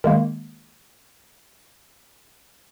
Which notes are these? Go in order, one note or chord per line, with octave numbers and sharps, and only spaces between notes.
D#3 G#3 A#3